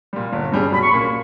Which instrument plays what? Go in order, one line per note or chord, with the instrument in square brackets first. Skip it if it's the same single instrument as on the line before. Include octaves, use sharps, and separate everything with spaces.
[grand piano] A#2 G3
G1
G2 G3 C#4 G#4
[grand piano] B1 [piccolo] B5
[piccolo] C#6
[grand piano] A#2 A#3 C#4 [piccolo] B5